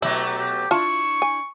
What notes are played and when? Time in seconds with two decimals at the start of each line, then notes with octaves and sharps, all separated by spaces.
0.02 B2 F#3 A3 E4 G4
0.38 G4
0.71 D4 E4 F4 A5 C#6
1.22 G#5